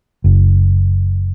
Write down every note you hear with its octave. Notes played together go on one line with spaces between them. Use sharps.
F#1